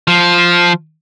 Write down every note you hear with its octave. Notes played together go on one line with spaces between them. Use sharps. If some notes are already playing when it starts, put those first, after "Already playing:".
F3